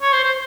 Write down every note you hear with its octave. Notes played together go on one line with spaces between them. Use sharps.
C#5
C5
C5